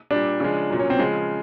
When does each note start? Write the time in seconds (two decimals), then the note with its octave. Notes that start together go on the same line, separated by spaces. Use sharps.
0.11 A#2 G3 D4
0.40 C#3 F3 G#3
0.70 A#2 F#3
0.79 C#4
0.90 C4
0.99 C#3 F3 G#3